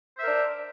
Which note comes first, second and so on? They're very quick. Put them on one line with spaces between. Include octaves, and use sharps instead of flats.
C5 E5 A#4 D4